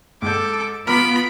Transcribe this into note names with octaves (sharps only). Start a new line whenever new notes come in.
G#2 A4 D6 G6
B3 F4 A#5 B5 D6 F6 D7